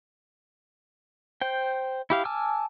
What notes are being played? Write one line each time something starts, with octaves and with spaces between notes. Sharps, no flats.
C5 G5
E4 G4 F5
G#5 A5 D6 E6 F6